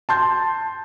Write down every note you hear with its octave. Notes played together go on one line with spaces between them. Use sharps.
A5 C6 G6